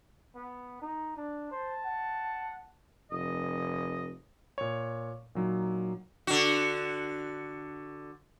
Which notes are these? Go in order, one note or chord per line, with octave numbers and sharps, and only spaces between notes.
B3
D#4
D4
C5 A5
F#5
F1 D#5
A#2 C#5
A#2 F#3 D#4
D3 F#4